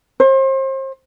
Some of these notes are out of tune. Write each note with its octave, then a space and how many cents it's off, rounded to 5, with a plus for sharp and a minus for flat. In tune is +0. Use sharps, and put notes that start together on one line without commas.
C5 +35